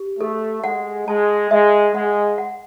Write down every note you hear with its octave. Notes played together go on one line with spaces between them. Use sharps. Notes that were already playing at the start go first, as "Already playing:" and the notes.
Already playing: G4
A3 A4
G#3 F#5
G#3 A5
G#3 E5
G#3 F#5
F#5